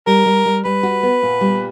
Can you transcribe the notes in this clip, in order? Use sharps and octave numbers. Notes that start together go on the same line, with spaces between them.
G3 A#4
G3
G3
G3 B4
F#4
B3
A#2
G3